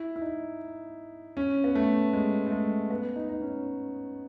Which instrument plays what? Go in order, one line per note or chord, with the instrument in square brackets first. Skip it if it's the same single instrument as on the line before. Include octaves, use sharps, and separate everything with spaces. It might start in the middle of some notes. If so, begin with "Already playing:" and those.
Already playing: [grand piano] E4
E4
D#4
C#4
B3
A3
G#3
A3
G#3
B3
D#4
D#4
C#4